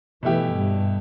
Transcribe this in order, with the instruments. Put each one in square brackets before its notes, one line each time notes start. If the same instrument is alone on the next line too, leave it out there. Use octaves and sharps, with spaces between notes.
[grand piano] B2 A3 E4 G4 [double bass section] E3
[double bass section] G2